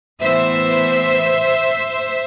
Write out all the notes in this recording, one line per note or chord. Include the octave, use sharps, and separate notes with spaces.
A2 E3 B3 C5 E5